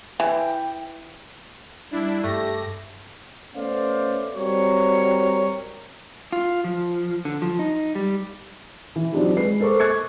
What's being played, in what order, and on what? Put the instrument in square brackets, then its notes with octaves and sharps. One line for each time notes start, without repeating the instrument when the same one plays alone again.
[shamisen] E3 [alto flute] G5
[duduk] G3 [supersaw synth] D4 E4
[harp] G2 [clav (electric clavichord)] A3 [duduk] G4 [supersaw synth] A#6
[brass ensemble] A3 B3 C#4 C5 D5 F5
G3 C4 F#4 A#4 C#5
[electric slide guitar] F4
F3
D3
F3
D#4
G3
[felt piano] E3
F#3 C4 D4 D#4 F4 G4
G#3 B4 C7
A4 A#4 C5 C#6 D6
C#6 F#6 G#6 A6 C#7